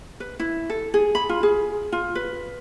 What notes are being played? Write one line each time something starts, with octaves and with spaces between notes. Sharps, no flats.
B4
E4
A4
G#4
B5
F4
G#4
F4
B4